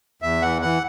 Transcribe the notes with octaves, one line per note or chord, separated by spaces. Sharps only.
E2 E5
E3 F#5
E3 F#5